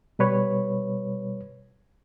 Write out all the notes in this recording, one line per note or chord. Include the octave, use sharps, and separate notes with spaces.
B2 G3 B4 C#5